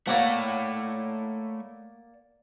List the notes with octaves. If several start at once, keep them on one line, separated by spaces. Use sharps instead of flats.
A3 A#3 C#5 D5 F#5